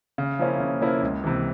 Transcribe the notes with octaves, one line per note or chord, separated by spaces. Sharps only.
C#3
F3 A#3 C#4 E4
C#3
F3 A#3 C#4 E4
C#2
C3 E3